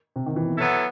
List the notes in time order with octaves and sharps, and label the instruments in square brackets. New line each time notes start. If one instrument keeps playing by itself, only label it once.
[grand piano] C3
D#3
E3
B2
[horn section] F#3 B3 E4 A4